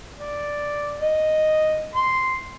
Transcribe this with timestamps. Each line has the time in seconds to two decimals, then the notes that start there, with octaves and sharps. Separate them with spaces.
0.19 D5
1.01 D#5
1.95 C6